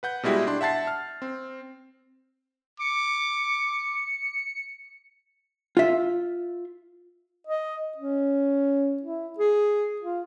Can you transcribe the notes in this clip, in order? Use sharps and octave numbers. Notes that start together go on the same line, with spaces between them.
B4 F#5 G6
B2 G3 G#3 E4 F#4 G4
D4 C6
E5 F#5 A5 A6 C7
F6
C4
D6 C#7
F4 E5
D#5
C#4
E4
G#4
F4